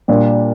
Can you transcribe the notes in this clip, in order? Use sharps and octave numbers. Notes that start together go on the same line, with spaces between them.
A#2 G3 A#3 D4 F4